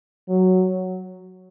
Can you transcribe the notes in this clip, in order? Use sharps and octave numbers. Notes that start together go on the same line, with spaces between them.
F#3